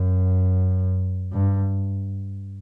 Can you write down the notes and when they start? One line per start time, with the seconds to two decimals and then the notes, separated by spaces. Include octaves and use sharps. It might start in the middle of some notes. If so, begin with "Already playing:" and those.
Already playing: F#2
1.33 G2